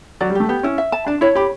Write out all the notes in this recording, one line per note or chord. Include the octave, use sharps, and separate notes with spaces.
F#3 D5
G3
A3 G4
B3 G4
C#4 E4
E5
A5
D4 A5
E4 C#5
G4 B5